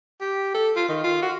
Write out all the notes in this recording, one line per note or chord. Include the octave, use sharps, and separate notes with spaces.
G4
A4
F4
D#3
F4
F#4